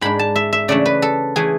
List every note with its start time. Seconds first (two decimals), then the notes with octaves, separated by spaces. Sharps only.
0.01 G#2 G#3 D4 B5
0.19 A5
0.36 E5
0.53 E5
0.68 C#3 E3 A3 D4 D5
0.86 B4
1.02 A4
1.36 E3 A3 G#4